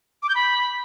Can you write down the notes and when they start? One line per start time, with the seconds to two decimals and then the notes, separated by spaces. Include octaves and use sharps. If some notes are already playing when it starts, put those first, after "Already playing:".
0.23 D6
0.29 G6
0.35 B5